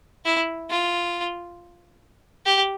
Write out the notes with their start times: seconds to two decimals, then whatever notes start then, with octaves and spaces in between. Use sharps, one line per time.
0.25 E4
0.70 F4
2.46 G4